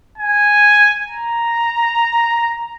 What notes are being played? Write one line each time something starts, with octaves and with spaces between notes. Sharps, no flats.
G#5
A#5